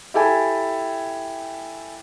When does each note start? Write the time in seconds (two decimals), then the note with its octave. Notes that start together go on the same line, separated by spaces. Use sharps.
0.14 E4 G4 A4 G5 G#5